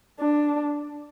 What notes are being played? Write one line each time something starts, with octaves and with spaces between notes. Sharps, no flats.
D4